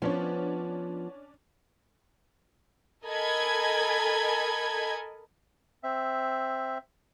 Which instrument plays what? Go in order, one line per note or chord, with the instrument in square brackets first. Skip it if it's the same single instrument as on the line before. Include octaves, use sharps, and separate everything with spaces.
[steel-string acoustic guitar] F3 B3 [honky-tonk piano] C#4 D4 C#5
[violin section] A4 A#4 D#5 G#5 B5 G#6
[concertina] C4 E5